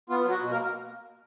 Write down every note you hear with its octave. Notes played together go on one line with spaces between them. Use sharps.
B3 F4
F#3 F#4
B2
A#3 A#4